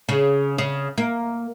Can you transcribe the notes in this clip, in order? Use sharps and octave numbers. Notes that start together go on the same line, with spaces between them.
C#3
C#3
A#3